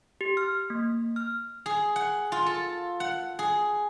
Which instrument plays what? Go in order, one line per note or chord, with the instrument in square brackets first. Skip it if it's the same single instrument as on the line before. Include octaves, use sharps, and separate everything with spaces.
[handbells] G4
F6
A#3
F6
[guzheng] G#4
F#5
F4
A4
F#5
G#4